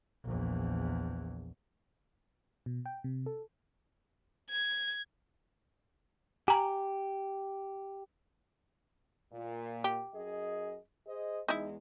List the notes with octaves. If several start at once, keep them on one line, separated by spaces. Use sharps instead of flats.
A#1 E2
B2
G5
C3
A4
G#6
G4 G#5 A#5
A#2
G4
F#2 G#4 D#5
G#4 C5 D#5
E2 G#3 D#4 E4